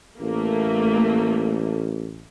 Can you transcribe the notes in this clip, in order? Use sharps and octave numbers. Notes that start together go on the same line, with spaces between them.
A1 A3 A#3